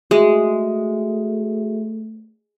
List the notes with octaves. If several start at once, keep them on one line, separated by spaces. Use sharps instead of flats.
G#3 A3 F#4 G#4 E5